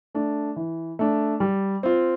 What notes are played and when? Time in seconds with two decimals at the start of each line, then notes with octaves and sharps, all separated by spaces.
0.15 A3 D4
0.56 E3
0.99 A3 D4
1.40 G3
1.83 C4 F4